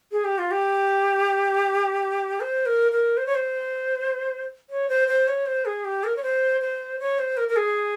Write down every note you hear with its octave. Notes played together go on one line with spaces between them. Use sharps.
G#4
G4
F4
G4
C5
A#4
A#4
C5
C#5
C5
C#5
C5
C5
C#5
C5
G#4
G4
A#4
C#5
C5
C5
C#5
C5
A#4
A#4
G#4